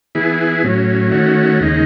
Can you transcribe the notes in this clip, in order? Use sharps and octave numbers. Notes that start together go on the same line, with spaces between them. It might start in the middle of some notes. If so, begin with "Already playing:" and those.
E3 B3 E4 G#4
A2 F#3 C#4
D#3 A3 C#4 F#4
D#2 C#3 G#3 D#4